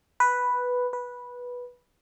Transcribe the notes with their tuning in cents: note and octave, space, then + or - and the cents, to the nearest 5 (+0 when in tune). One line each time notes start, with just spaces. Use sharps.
B4 +0
B4 -10